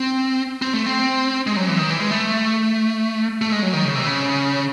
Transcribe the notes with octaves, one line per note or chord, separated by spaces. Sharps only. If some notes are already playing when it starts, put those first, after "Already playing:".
Already playing: C4
C4
A3
C4
G#3
F#3
E3
D#3
E3
G#3
A3
A3
G#3
F#3
D#3
C#3
C3
C#3